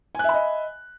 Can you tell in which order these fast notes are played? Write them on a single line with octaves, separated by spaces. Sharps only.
G#5 F#6 E5 B5 D#5